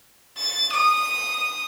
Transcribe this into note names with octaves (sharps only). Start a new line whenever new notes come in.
A6
D#6